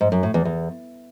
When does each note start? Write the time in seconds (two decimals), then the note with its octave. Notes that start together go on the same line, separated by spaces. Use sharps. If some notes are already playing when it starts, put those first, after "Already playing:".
0.01 G#2
0.12 F#2
0.23 A2
0.34 E2
0.45 E2